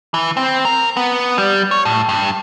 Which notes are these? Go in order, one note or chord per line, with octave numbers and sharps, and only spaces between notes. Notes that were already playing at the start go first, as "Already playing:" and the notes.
E3
C4
A#4
B3
G3
C#5
A2
G2